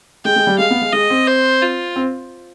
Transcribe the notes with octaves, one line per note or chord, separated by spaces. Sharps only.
G#3 G5
G#3
G3
G#3 F5
B3
G#3
G#3 D#5
C4
C5
F4
C4